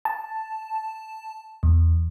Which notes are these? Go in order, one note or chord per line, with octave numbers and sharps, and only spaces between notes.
A5
E2